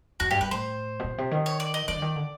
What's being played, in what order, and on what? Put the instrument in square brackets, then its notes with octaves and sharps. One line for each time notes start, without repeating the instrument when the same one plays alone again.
[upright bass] F2 [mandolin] F#4
[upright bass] G2 [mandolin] G4
[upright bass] G#2 [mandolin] B4
[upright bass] A2 [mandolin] C5
[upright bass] B2
A#2
C3
D#3
[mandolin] C#5
D5
D#5
[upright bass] D#3 [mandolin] D5
[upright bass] D3
D#3
D3